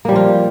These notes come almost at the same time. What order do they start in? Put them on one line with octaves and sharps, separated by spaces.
A#3 G3 F3 F4